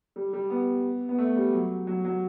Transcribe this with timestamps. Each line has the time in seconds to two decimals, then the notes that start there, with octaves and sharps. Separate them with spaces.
0.16 G3
0.33 G3
0.50 B3
1.09 B3
1.18 A3
1.36 G3
1.53 F#3
1.87 F#3
2.05 F#3